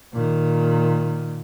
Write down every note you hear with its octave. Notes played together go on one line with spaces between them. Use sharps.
A#2 D#3